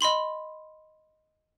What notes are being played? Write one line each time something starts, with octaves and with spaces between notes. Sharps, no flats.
D#5 B5 C6 F#7